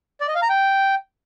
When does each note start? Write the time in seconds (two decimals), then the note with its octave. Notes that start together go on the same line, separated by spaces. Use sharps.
0.21 D5
0.28 D#5
0.35 F5
0.42 A#5
0.49 G5